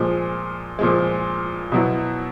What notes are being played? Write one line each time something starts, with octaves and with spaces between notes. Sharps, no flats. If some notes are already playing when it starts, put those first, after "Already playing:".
Already playing: A#2 F3 G#3
A#2 F3 G#3
B2 F#3 B3 E4